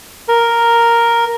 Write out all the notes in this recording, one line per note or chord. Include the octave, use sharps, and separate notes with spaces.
A#4